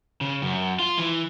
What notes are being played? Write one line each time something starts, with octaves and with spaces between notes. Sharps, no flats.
C#3
F#2
F4
E3